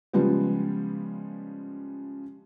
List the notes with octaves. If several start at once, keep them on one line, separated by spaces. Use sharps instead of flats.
C#3 F3 G3 G#3 B3